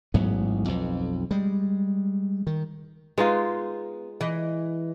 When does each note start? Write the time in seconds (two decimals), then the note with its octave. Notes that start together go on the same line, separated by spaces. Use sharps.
0.14 A1 G#2 F#3 B3
0.68 B1 F2
1.31 G3 G#3
2.47 D#3
3.18 G#3 B3 D#4 F4
4.21 E3 D#5